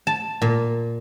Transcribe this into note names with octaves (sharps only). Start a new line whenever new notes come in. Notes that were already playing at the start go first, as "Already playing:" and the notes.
A5
A#2